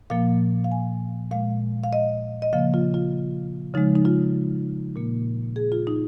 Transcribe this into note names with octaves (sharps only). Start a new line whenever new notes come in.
A#2 F3 A#3 F5
F5
G#5
A#2 G#3 F5
F5
D#5
D#5
C#3 F3 A#3 F5
F4
F4
C#3 F3 G#3 D#4
D#4
F4
A#2 A#3
G#4
F4
D#4